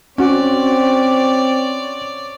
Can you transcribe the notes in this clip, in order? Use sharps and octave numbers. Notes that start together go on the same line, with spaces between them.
C4 C#4 F#4 C#5 D5